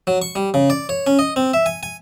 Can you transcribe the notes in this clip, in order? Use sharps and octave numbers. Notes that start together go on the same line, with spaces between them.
F#3
C#6
G3
C#3
D5
C#5
C#4
D#5
C4
E5
G#5
G#5